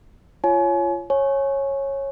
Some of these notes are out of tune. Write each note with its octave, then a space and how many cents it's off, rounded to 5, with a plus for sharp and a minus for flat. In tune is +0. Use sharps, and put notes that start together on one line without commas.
F4 -25 C#5 +0 G#5 +35
C#5 -15 G#5 +15